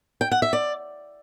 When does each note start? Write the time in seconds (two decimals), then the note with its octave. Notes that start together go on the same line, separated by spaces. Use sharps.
0.21 G5
0.31 F#5
0.42 E5
0.53 D5